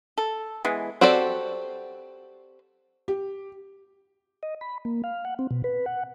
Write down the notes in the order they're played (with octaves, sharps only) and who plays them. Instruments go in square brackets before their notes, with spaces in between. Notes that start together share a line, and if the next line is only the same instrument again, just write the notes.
[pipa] A4
E3 G#3 B3
[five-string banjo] C4 F#4 G4 A4 D5
[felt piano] G4
[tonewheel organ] D#5
B5
A#3
F5
F#5
C4
B2
B4
F#5